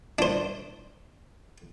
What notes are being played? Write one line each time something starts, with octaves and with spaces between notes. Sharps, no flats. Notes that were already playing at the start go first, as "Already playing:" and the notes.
D4 C5